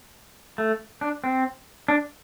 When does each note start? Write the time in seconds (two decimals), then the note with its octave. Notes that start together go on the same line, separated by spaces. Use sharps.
0.58 A3
1.01 D4
1.24 C4
1.88 D4